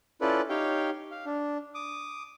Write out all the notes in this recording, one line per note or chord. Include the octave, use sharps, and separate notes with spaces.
C#4 E4 F4 A4 B4 D5
D#4 G4 C#5 F5 G5
F5
D4
D6 D#6